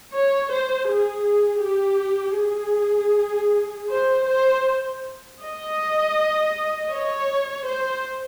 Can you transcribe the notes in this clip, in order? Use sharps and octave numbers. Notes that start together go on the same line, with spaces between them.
C#5
C5
G#4
G4
G#4
C5
C5
D#5
C#5
C5